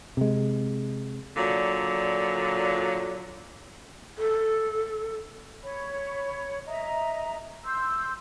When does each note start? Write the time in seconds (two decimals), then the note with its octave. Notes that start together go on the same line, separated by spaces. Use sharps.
0.17 C3 G#3
1.36 A#2 D3 F#3
4.18 A4
5.63 C#5 B5
6.68 D#5 E5 A#5
7.65 C6 E6 G6